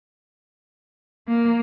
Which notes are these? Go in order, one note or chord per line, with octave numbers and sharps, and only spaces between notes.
A#3